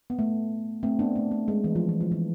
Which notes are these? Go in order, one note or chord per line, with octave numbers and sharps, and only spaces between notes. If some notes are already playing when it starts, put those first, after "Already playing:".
B3
A3
A3 C4
B3 D4
A3
A3
G#3
E3
F3
E3
F3
E3